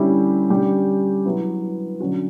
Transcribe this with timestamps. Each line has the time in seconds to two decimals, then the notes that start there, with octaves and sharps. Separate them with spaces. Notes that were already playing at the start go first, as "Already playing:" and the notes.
Already playing: D3 G3 C#4 E4 G4
0.50 D3 G3 C#4 G4
1.25 F#3 B3 E4
2.00 D3 F#3 C#4 F#4